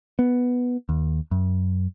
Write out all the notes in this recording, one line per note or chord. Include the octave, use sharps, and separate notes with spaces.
B3
D#2
F#2